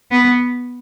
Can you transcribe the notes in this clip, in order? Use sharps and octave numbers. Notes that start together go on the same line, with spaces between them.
B3